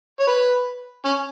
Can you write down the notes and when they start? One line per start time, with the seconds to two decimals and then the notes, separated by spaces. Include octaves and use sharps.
0.20 C#5
0.27 B4
1.05 C#4